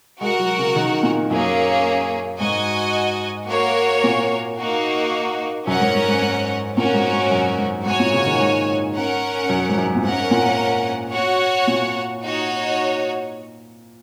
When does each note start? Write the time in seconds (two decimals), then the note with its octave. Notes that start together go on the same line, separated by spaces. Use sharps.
0.21 G#3 F#4 A#4 F#5
0.39 F#3
0.58 C#3
0.76 D#3
1.03 A#2
1.30 F#2 A#3 C#4 G#4
2.39 G#2 F#4 D#5 G#5
3.49 A#3 F#4 A#4 C#5
4.04 A#2
4.58 A#3 D#4 F#4
5.67 F#2 C#4 A#4 F#5
5.80 G#2
5.95 G#2
6.08 G#2
6.22 G#2
6.77 A#2 C#4 F#4 A#4
6.94 G#2
7.13 G#2
7.31 F#2
7.58 G#2
7.85 G#2 F#4 C#5 G#5
7.99 A#2
8.13 C#3
8.26 D#3
8.40 G#2
8.94 C#4 A#4 F#5
9.49 F#2
9.69 G#2
9.77 F#2
9.96 A#2
10.04 G#2 C#4 A#4 F#5
10.31 A#2
11.13 F#4 C#5 F#5
11.67 A#2
12.22 D#4 F#4 C#5